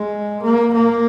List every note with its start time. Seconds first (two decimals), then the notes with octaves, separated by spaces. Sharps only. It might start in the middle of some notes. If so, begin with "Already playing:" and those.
Already playing: G#3
0.43 A#3
0.74 A#3